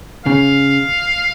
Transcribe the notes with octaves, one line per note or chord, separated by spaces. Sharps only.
C#3 F5